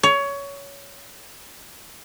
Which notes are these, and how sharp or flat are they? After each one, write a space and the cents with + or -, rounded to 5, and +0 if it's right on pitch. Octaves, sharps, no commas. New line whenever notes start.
C#5 +20